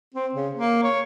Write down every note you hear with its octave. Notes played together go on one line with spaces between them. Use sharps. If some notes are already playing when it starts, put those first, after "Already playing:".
C4
C#3
A#3
C#5